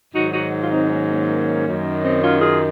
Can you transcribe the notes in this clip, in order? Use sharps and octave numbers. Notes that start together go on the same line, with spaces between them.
G#2 D#3 F#3 D#4 F#4
D#4 F#4
F4
C4 D#4
A#3 C#4
A#3 C#4
F#2 D#3 F#3
C4 D#4
C#4 F4
F4 G#4